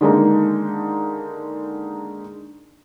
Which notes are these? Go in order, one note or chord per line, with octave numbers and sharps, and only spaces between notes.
D3 D#3 G#3 A#3 D4 D#4